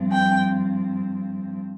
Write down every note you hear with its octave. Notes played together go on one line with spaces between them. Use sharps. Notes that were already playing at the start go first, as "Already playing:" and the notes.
Already playing: G2 F3 C4
G5